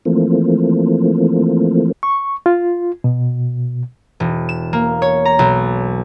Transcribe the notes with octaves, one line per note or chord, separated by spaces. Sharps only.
E3 F3 A3 A#3 C4
C#6
F4
B2
E1
E7
A#3
C#5
A#5
B1